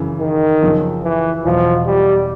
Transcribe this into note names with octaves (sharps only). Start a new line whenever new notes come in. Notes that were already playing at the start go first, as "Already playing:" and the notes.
Already playing: F#2 C#3 E3
D#3
F#2 C#3 F3
E3
E2 B2 F3 F#3
G3